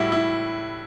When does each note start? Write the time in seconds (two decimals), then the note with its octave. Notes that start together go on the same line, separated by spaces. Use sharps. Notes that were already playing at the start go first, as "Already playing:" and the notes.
Already playing: A2 G3 E4 F#4
0.12 E4